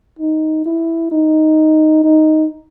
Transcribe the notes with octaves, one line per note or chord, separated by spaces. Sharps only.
D#4
E4
D#4
D#4